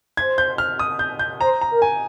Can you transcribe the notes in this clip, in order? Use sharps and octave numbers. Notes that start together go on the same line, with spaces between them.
C5 G#6
G6
F6
D#6
G6
G6
C5 A#5
A#5
A#4
G#5